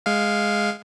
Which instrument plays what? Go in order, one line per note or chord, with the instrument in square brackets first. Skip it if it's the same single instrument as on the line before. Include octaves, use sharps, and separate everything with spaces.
[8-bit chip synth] G#3 F5